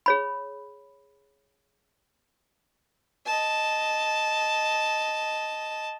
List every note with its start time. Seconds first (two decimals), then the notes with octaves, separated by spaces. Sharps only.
0.06 G#4 C#5 B5
3.26 D#5 A5